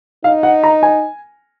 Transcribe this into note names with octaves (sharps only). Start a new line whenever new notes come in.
D#4 F5
F#5
A#5
G#5